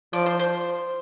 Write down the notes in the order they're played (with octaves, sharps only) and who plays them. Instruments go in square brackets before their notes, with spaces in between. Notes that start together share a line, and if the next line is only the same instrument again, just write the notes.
[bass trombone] F3 [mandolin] D5
[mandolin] C5
C5